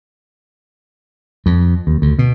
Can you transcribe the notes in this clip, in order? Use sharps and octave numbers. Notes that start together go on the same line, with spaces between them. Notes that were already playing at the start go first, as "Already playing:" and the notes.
F2
D#2
D2
B2